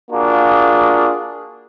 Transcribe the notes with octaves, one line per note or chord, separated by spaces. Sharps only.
A#3 D4 F4 F#4 G#4